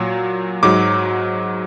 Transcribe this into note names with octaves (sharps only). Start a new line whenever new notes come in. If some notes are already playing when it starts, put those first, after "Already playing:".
Already playing: A#2 F#3
G#2 F#3 D6